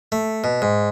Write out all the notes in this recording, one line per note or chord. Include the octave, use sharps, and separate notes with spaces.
A3
B2
G#2